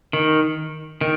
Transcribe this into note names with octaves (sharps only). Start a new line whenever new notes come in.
D#3
D#3